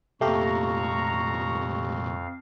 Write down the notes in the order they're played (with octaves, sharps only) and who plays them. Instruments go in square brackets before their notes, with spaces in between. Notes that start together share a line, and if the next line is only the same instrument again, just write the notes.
[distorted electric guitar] C2 A#2 [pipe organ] F2 F5 [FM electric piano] A3 G4 [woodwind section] A#5 C#6